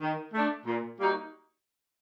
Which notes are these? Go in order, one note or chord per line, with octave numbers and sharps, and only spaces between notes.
D#3
A3 D4
A#2
G3 A#3 D#4 F#4